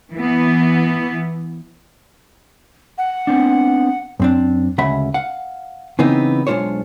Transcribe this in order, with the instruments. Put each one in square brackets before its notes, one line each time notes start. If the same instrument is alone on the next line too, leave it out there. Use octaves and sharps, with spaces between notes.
[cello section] E3 B3
[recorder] F#5
[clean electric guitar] B3 C4 D4
[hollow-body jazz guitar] F#2 C4 D4
D2 C#3 G#3 E5 F#5 B5
F5 F#5
C#3 E3 B3 C4 D#4
B1 G#3 D4 F4 C5 C#5